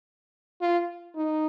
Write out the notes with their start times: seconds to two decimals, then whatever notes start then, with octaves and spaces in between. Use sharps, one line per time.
0.61 F4
1.15 D#4